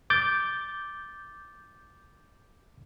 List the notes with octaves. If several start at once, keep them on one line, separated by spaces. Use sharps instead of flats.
D6 G6 A6